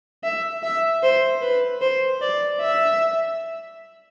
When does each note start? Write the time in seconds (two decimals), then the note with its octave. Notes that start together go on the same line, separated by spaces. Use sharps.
0.24 E5
0.63 E5
1.03 C5
1.42 B4
1.82 C5
2.22 D5
2.61 E5